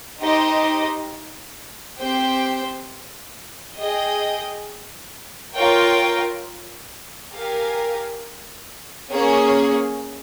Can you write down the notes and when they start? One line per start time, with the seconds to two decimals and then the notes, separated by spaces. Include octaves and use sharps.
0.21 D#4 G4 C5 D#5
2.00 C4 G4 C5 G5
3.78 G#4 D#5 G5
5.55 F4 A#4 C#5 G5
7.33 G4 A#4 F5 G#5
9.11 A#3 C#4 G#4 C#5